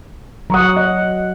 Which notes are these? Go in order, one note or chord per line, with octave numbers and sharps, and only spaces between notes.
F#3 F#5 A#5 C#6 D#6
D#5